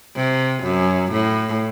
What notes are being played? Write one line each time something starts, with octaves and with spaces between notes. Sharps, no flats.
C3
F#2
A2